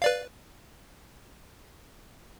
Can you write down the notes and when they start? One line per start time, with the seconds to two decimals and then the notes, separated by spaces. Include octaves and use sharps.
0.02 B4 D5 F5